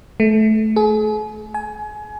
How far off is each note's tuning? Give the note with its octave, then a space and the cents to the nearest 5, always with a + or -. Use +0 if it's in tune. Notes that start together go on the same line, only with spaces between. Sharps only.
A3 -20
G#4 +40
G#5 +25